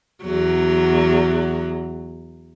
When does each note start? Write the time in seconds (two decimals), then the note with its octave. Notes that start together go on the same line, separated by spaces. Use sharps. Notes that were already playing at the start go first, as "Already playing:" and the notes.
0.23 E2 F#3